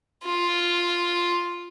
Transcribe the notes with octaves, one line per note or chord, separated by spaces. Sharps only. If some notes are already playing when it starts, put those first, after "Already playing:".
F4